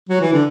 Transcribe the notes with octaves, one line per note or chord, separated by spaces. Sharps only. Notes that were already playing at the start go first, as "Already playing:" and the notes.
F#3
E3
D3